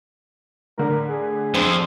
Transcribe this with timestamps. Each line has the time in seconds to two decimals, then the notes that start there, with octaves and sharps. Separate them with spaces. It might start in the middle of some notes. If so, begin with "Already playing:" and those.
0.78 A2 D3 A#4
1.09 G#4
1.54 F2 C4 D4 C5